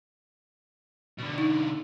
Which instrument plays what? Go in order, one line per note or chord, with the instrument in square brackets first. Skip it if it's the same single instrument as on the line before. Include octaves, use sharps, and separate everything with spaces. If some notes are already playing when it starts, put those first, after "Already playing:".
[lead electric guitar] B2 D3
[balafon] D#4